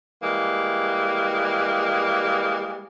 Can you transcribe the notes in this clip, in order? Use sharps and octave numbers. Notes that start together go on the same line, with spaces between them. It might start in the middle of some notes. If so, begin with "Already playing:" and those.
E3 G3 G#3 A#3